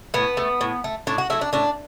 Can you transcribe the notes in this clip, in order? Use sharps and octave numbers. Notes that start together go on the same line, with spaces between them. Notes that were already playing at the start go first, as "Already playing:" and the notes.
A2 B3
A3
A2
A3
A2 D4
F#4
F#3 A3 E4
D4
A2 D4